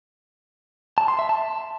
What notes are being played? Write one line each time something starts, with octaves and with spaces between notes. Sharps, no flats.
A5
C6
E5
A5